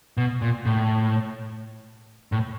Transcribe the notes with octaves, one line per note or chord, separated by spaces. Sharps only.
B2
A#2
A2
A2